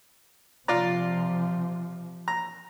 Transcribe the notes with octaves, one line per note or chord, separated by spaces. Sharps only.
C3 F3 F4 D5 A#5
A#5